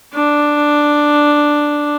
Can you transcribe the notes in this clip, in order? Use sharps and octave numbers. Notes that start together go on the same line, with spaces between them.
D4